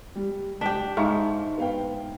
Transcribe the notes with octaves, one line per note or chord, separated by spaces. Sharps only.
G3
D4 G4 B6
G#2 G#3 D#4 E5 F5 C#6
B3 F5 G5